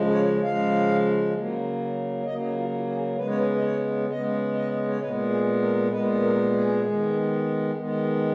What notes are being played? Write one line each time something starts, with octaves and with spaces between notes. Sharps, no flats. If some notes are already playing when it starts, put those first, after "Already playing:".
Already playing: C#3 F3 G#3
C#5
C#3 F3 G#3 F5
C#3 F#3 A#3
C#3 F#3 A#3 D#5
F4
G#4
C#3 G#3 B3 B4
C#5
B4
D#5
C#5
C#3 G#3 B3 D#5
D#5
C#5
A#2 G#3 B3 B4
G#4
A#4
A#2 G#3 B3 B4
A#4
G#4
D#3 G#3 B3
D#3 G#3 B3